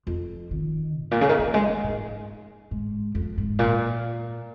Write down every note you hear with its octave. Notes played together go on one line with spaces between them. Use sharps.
F2
D#3
G#2
A#2
C#3
D#3
F3
G#3
F3
G#2
G#2
F2
G#2
A#2